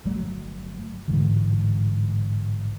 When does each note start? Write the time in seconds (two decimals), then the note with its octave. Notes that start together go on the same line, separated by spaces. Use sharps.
0.05 G1 F3 F#3 A3
1.08 A1 G#2 D3 E3